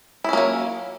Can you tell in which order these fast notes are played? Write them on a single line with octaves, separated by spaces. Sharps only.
E4 C#4 A#3 F#3